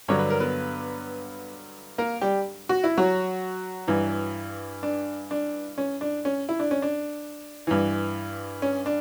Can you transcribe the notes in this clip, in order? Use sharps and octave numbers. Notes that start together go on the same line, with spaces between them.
G2 D3 F#3 C#5
B4
A#4
B3 B4
A#3 A#4
G3 G4
F#4
E4
F#3 F#4
G2 E3
D4
D4
C#4
D4
C#4
E4
D4
C#4
D4
G2 E3
C#4
D4